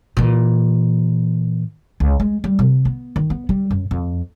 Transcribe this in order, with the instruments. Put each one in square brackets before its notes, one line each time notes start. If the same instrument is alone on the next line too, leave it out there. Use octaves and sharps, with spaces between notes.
[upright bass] A#2 E3
C#2
G#3
G3
C3
B3
D#3
B3
G3
F#2
F2